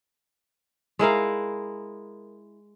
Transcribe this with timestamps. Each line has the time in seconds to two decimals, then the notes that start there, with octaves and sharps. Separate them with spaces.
0.99 G#3 E4 A#4 F5